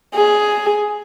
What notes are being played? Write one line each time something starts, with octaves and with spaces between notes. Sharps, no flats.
G#4